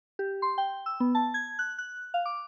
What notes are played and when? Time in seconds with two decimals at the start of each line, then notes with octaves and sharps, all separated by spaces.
0.19 G4
0.42 C6
0.58 G5
0.86 E6
1.00 B3
1.15 A5
1.34 G#6
1.59 F#6
1.78 F#6
2.14 F5
2.26 D6